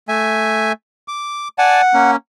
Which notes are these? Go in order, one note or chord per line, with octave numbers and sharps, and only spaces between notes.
A3 E5 G#5
D6
D5 F#5 G#5 A5
A#3 C#4